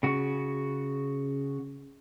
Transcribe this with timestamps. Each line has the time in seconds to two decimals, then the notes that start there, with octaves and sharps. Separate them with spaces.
0.03 C#3 F#4